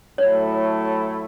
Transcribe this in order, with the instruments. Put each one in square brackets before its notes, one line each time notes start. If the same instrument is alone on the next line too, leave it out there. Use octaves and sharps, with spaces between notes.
[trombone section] A2 F#3 A3 E4 [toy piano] C#5